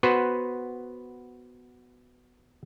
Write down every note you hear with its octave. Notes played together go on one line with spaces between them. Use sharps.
B3 F#4 B4 C5